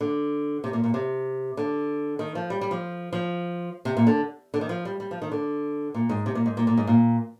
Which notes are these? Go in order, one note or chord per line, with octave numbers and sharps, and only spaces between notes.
D3
C3
A#2
A#2
C3
D3
D#3
F3
G3
G3
F3
F3
C3
A#2
D3
D3
D#3
F3
G3
G3
F3
D#3
D3
A#2
G#2
C3
A#2
G#2
A#2
A#2
G#2
A#2